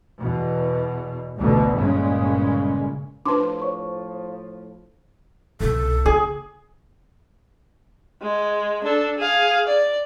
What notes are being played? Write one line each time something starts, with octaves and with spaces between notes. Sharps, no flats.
E2 B2
A1 D2 B2 D3
G1 A#2 C#3 G#3
A2 F3 D4 B4 A5 C6 D6
C5 C#5 C#6
C2 B2 A4
C#3 G#4
G#3
D4 A4
G#4 F5
D5